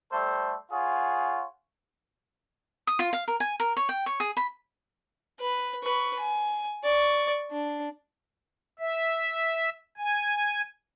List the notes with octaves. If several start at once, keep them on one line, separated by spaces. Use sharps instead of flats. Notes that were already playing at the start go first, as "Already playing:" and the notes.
G3 A3 A4 C5
F4 G#4 C#5 F#5
D#6
F4
F5
A#4
G#5
A#4
C#5
G5
C#5
G#4
B5
B4
B4 C#6
G#5
D5 C#6
D4
E5
G#5